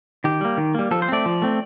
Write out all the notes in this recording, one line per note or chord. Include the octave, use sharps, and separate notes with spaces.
D#3 G4
G3 A#3
D#3
G3 A#3
F3 A4
C5
A3 C4 D5
F3
A3 C4